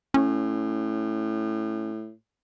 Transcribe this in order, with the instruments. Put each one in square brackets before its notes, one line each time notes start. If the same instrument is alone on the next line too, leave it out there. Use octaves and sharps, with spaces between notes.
[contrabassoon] A2 [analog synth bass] C#4